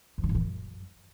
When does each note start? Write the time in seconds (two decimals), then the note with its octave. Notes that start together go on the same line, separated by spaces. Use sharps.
0.18 F2
0.23 D3
0.29 A2
0.35 E3
0.40 F#2